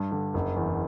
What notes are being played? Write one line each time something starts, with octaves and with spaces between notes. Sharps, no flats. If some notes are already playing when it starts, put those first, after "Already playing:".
Already playing: G2
D3
F#1
E2